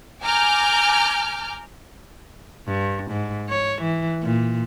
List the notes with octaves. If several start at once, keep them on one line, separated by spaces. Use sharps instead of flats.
G#5 A#5 D6 F6 G6
G2
G#2
C#5
E3
A#2